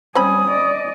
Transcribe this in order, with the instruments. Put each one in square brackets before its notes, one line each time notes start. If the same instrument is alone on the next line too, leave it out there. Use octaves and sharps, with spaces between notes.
[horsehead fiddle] G3 G#5 [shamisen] C4 C#4 B5 [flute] D#6
[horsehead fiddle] D5 D#5